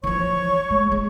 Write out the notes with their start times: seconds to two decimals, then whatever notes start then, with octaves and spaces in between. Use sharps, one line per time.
0.03 E3 F3 C#5 C#6
0.70 G#3
0.92 G#3